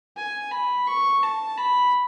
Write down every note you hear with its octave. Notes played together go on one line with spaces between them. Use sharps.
G#5
B5
C#6
A5
B5